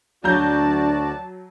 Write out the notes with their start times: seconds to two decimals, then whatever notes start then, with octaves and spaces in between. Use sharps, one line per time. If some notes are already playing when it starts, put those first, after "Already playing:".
0.24 D2 F#3 D4 F#4 D5 A5 A#5 G6